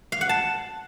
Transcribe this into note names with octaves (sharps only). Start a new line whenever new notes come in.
F5
F#5
A5